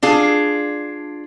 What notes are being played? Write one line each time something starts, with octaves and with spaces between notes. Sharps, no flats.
D4 F4 G#4